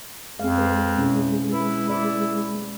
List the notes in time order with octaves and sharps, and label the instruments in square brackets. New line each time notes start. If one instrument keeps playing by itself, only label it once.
[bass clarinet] F2 [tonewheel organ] G#3 [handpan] C4 F5
[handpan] B4
B2 C#4 E4
[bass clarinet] E4 [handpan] B4
[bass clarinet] E4 [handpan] D5